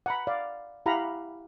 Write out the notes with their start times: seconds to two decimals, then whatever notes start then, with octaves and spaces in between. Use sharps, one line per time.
0.06 F#5 A#5 B5
0.27 D5 F5
0.86 E4 G4 F5 F#5 A#5 B5